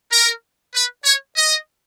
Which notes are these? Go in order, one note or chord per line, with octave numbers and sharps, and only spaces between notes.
A#4
B4
C#5
D#5